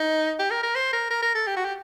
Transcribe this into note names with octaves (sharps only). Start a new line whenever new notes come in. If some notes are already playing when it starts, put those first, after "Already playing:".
Already playing: D#4
G4
A#4
A#4
C5
A#4
A#4
A#4
A4
G4
F#4
G4